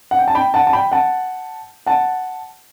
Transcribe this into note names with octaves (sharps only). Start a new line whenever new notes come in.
F#5
G5
A5
G5 B5
F#5 A5
A5
G5 B5
F#5 A5
F#5 A5